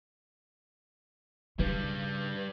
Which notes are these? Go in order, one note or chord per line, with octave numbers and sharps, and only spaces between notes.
G2 C#3 G3 B4